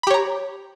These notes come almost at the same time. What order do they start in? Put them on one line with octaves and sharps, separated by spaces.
B5 G4 C#5 A#5